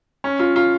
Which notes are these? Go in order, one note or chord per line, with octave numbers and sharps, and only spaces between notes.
C#4
F4
F4